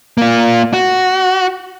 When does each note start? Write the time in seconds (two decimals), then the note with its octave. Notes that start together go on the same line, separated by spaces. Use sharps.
0.18 A#3 F4
0.74 F#4